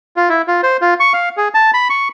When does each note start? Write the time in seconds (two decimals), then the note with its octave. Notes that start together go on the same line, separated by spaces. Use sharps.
0.17 F4
0.29 E4
0.48 F4
0.63 C5
0.82 F4
1.00 C#6
1.13 F5
1.37 G#4
1.54 A5
1.74 B5
1.90 C#6